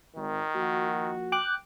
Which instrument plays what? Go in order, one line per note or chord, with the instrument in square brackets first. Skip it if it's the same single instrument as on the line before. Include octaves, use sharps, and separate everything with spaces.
[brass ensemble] G#1 [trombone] D#3
[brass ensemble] F3 A#3 F#4
[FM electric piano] G5 D6 F#6